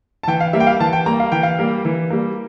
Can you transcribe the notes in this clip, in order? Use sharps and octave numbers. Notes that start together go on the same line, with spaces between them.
A5
E3 G5
F5
G3 A#3 E5
G5
F5
E3 A5
G5
G3 A#3 A#5
F5
E3 G5
F5
G3 A#3
E3
G3 A#3